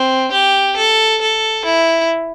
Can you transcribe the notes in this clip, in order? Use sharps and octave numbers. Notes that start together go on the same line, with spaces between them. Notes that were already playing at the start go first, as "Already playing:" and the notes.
Already playing: C4
G4
A4
A4
E4